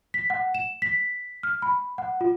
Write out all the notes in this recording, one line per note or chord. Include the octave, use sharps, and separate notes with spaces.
B6
F#5
E7
B6
F6
B5
F#5
F4